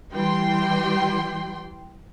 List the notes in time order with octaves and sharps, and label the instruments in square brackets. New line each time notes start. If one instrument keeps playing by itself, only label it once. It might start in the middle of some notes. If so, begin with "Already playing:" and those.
[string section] E3 G3 G5 C6